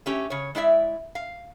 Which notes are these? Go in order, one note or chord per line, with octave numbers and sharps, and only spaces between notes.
A3 C#4 G4
C#3 C#5
G#3 E4 D5 E5
F5